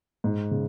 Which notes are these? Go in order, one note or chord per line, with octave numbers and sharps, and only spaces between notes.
G#2
C#3